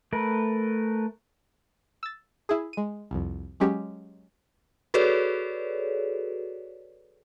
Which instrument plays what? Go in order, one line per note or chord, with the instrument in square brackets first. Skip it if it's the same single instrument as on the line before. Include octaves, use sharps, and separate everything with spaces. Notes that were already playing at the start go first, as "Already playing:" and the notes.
[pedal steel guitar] A3 A#4 B4
[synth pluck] E6 A6
E4 G#4
G#3 D#7
C2 F2
F#3 G#3 C#4 G4
[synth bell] F#4 G#4 A4 B4 C#5 D5